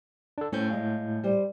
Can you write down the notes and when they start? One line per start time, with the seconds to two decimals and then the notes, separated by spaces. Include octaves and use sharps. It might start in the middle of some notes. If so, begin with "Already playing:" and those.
0.38 D4 A4
0.52 A2 C#4 C5 G6
0.70 G#3 F5
1.24 G3 C5